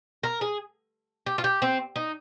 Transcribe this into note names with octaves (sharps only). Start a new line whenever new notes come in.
A#4
G#4
G4
F4
G4
C4
D#4